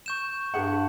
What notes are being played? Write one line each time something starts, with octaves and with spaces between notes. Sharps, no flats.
C#6 G6 E7
G2 G4 G#4 F#5